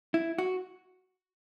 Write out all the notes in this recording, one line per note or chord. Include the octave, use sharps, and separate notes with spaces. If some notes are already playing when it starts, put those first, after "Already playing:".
E4
F#4